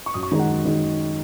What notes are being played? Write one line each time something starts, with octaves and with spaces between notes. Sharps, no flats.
C#6
F#2 D#6
C#6
D#3 G#3 D#4 A#5
F#5
F#2
D#3 G#3 D#4